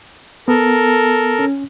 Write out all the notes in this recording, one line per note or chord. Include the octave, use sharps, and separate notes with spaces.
B3 A4 A#4
C#4